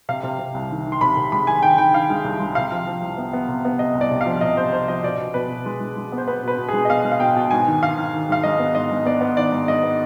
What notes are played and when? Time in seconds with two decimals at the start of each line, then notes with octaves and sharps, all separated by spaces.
0.09 C3 F5
0.23 C3
0.39 C3
0.54 C2
0.71 D#3
0.86 D#3
0.92 C6
1.01 C3 B5
1.17 C3
1.32 G#3 B5
1.47 D#3 G#5
1.62 D#3 G5
1.78 D#3 G5
1.94 D#3 F5
2.10 G#3
2.24 C2
2.40 G#3
2.55 C3 F5
2.71 F3
2.86 F3
3.02 C2
3.17 B3
3.33 B3
3.48 C3
3.65 B3
3.79 C3 D#5
3.95 C2
4.01 D5
4.11 C3
4.21 F5
4.26 F3
4.41 C3 D#5
4.57 C3 C5
4.73 C3 C5
4.88 F3 D#5
5.03 B2 D5
5.19 B2
5.34 B2 B4
5.50 B2
5.66 G#3
5.80 G#3
5.97 G#3
6.12 B3
6.18 C5
6.27 B3 B4
6.43 B2 B4
6.58 B2
6.68 G#4
6.73 G#3
6.85 D#5
6.90 B2 F5
7.04 G#3
7.12 F5
7.20 B2 G5
7.36 B2
7.51 G#2 G#5
7.67 D#3
7.82 D#3 F5
7.98 D#3
8.14 D#3
8.29 G#2 F5
8.43 G#2 D#5
8.59 B3
8.75 G#2 D#5
8.91 G#2
9.05 B3 D5
9.21 B3
9.37 D#3 D5
9.52 G#2
9.68 G#2 D#5
9.83 B3